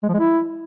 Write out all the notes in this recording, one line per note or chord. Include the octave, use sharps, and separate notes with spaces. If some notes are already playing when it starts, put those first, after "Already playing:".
G#3
F3
G#3
E4